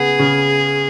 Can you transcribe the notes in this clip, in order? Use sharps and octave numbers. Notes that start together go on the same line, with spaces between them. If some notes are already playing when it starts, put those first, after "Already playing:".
Already playing: C#3 B3 G#4
C#3